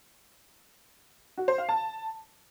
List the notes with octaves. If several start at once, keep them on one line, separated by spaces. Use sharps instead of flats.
F#4
C5
F5
A5